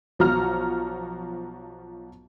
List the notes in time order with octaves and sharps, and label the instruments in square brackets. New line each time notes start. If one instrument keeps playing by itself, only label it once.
[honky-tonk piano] B1 F3 F#4 A#5 F6